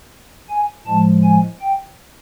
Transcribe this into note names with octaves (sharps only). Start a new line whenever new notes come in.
G#5
A2 F3 G#3 A5
G#5
G5